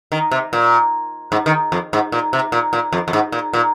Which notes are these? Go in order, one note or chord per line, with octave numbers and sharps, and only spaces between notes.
D#3
C3
A#2
G#2
D#3
F2
G#2
A#2
C3
A#2
A#2
F2
F2
G#2
A#2
A#2